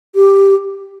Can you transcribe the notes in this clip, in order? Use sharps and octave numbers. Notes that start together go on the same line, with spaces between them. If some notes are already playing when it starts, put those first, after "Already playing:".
G4